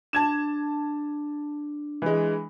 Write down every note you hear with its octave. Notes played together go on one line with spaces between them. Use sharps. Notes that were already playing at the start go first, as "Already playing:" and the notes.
D4 A5 G#6 E7
E3 G#3